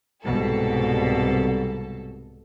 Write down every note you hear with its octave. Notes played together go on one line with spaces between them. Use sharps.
C2 G#2 B2 A4